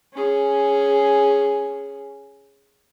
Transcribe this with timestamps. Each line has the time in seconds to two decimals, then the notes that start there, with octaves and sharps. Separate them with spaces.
0.14 C#4 G#4